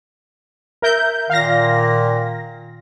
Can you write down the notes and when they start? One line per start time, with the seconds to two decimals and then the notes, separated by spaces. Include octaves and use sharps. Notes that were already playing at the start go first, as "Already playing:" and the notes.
0.82 A#4 E5 G6
1.30 A#2 D#3 F5 A#6